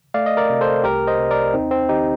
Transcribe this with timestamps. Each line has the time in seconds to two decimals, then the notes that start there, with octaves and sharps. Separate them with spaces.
0.14 A3 D5 F5
0.26 D#5
0.37 A#4 D5
0.50 C3
0.61 A4 C5
0.84 C2 G4 A#4
1.07 C5 D#5
1.19 C3
1.31 A#4 D5
1.54 D#2 C4 D#4
1.71 C4
1.89 D#3 D#4 G4